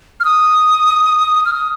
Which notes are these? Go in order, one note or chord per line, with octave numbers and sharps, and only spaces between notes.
F6
D#6
F6
D#6